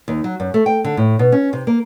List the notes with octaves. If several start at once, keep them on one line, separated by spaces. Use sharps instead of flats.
D#2
F#3
F#2
A3
G5
D3
A2
B2
C#4
C3
A#3